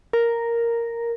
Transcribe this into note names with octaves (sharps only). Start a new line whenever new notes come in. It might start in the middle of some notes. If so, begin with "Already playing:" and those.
A#4